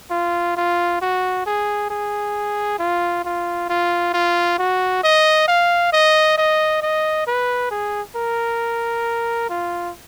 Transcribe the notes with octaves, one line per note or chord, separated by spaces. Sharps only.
F4
F4
F#4
G#4
G#4
F4
F4
F4
F4
F#4
D#5
F5
D#5
D#5
D#5
B4
G#4
A#4
F4